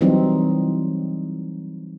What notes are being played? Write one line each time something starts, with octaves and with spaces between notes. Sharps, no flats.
E3 F#3 G3 C4 D#4